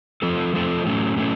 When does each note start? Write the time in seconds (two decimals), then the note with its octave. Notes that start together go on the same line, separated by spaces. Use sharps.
0.22 F3 A3 C4 F4 A4
0.54 F3 A3 C4 F4 A4
0.85 A2 F#3 A3 C#4
1.16 A2 F#3 A3 C#4